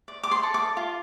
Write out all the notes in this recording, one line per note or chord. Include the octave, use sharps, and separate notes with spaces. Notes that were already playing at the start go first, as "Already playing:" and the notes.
D5
D6
C6
A4
D6
F4